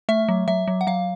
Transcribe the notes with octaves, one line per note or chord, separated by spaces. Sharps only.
A3 E5
F#3
F#3 E5
F#3
F#5
F#3 F5